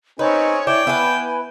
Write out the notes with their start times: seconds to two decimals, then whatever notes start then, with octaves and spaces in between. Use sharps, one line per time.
0.19 C4 C#4 D#4 G#4 B4 C#5
0.67 D4 E4 G5
0.87 B3 E4 B4 G#5